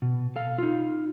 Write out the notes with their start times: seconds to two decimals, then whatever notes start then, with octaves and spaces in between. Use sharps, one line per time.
0.02 B2
0.36 A4 F5
0.58 D#4 F4